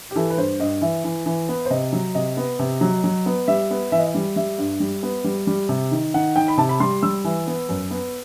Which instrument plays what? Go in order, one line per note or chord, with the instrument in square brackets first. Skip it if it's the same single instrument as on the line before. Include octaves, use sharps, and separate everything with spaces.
[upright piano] G4
E3 A4
B4
G2 C5
G2 D#5
E3 E5
E3
E3
B3
C5
C3 D#5
F#3
C3 D#5
B3
C3
F#3
F#3
B3
G3 E5
B3
E3 E5
D#5
E5
G3
G3 E5
G2
G3
B3
G3
G3
C3
D#3
D#3 F#5
D#3 G5
B5
C3 A5
B5
G3 C6
G3 E6
E3
B3
F#2
B3